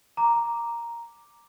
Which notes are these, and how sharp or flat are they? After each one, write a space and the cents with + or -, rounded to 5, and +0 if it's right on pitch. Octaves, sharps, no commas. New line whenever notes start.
A#5 +0 D6 +0